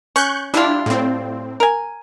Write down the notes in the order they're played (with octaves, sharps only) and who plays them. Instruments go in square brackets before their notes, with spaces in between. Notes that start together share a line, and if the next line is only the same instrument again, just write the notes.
[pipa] C#4 [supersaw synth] C#6 F#6 G6
[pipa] G3 F4 [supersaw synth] D4 E4
[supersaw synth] A2 C4
[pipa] A#4 G#5